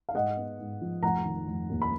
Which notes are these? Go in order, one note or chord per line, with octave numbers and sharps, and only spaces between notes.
F5
G#2 D#5 F#5
B3
G#2
F3
F1 F#5 A#5
D#3
F1
D#2
B5